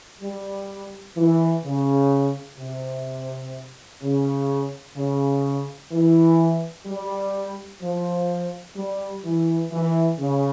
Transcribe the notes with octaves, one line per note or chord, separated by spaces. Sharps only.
G3
E3
C#3
C3
C#3
C#3
E3
G3
F3
G3
E3
E3
C#3